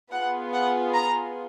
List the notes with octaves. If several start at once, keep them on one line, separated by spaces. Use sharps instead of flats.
B3 F4 G#4 F#5
F#5
A#5